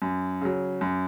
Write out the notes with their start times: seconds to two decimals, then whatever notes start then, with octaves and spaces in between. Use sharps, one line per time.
0.02 F#2
0.41 C#3 F#3
0.81 F#2